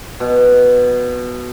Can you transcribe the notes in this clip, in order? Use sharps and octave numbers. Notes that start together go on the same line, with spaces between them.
B2